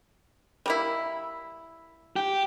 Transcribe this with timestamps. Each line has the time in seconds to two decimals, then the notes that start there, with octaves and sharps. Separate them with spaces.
0.66 G3 A#3 E4
2.16 G4